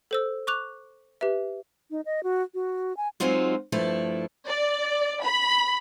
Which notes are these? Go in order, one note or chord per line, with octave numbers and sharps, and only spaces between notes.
A4 C5 E6
C#6 D6 F#6 F7
G4 B4 E5
D#4
D#5
F#4
F#4
G#5
F#3 G#3 C4 D#4 F4 F#4
G2 F3 A3 E4
D5
B5